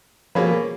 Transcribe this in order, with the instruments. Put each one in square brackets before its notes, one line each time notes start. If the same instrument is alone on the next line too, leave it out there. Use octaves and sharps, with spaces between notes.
[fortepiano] B2 A#3 C#4 G#4 B4 [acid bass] F3